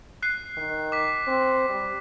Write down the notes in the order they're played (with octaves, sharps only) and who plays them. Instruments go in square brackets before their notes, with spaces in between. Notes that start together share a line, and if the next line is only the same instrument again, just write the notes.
[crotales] F#6 C7
[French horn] D#3
[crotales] D6 B6
[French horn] C4
G3